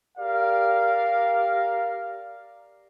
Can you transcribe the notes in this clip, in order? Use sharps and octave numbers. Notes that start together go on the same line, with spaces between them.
G4 A#4 D5 F5